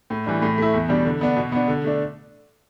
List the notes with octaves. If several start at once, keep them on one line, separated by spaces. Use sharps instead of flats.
A2
E3 G3 D4
A2
A3 E4
E2
B2 G3 D4
D3
B3 D4
B2
B3 D4
D3
A3 D4